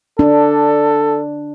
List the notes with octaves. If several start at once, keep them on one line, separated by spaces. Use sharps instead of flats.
D4 A4